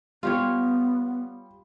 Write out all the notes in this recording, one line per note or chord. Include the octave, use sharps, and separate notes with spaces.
G3 B3 F4 G4 C#5